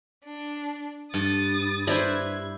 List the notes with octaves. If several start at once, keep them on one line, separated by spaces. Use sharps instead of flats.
D4
G2 D#6 A6
E4 B4 C5 D5 A#5 B5 G#6